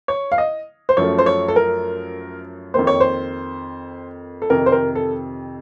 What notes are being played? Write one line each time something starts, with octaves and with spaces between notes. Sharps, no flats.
C#5
F5
D#5
C5
F#2 F3 A3 C#5
C5
C#5
A4
A#4
F2 D#3 A#3 C5
C#5
C5
A4
F2 C3 D#3 A#4
C5
A#4
A4